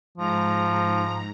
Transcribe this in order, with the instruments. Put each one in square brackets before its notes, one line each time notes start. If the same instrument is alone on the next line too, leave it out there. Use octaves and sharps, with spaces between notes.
[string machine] G#2 A#5 [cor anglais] F3